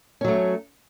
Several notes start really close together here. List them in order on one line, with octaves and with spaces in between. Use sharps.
C#4 F#3 A3